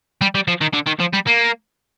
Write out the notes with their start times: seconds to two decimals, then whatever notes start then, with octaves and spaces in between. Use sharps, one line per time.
0.22 G3
0.35 G3
0.48 F3
0.61 D#3
0.74 D3
0.87 D#3
1.00 F3
1.14 G3
1.27 A#3